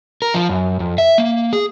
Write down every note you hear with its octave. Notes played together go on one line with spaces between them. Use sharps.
A#4
F3
F#2
F2
E5
A#3
G#4